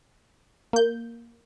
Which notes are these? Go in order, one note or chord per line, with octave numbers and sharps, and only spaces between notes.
A#3 G6